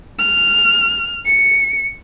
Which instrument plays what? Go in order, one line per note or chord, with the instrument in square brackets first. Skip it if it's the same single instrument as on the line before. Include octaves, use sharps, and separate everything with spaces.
[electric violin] F6
C#7